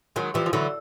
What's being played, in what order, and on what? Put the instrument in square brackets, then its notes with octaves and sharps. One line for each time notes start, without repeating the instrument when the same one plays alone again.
[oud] D#3 [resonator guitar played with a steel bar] F#3 G#3
[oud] E3 [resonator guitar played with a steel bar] F3 G3
[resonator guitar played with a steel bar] F3
[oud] D3 [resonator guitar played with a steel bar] E3 F#3